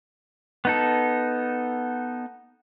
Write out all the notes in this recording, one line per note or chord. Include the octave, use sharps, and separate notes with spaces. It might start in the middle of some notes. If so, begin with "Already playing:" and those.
B3 D#4 A4